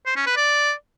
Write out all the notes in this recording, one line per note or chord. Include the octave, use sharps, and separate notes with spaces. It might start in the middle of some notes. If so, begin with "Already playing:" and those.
C5
C#4
B4
D5